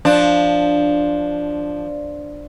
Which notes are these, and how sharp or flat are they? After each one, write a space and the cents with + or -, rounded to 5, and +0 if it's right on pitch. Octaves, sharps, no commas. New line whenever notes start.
F3 +0 D4 +0